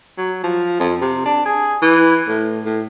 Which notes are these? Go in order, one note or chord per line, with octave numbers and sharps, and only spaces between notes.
F#3
F3
F2
C3
D4
G#4
E3
A2
A2